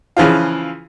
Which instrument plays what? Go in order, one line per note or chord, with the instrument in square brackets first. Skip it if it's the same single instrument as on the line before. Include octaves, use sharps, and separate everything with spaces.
[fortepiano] C#3 E3 F3 F4